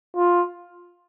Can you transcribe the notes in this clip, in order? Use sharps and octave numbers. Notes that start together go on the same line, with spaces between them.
F4